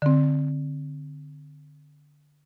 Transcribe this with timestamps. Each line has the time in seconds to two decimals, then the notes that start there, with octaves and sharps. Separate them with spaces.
0.02 D3 C4